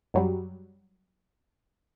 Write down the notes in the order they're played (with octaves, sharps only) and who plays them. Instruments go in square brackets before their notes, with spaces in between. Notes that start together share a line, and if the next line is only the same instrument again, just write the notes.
[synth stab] F#2 F#3 G3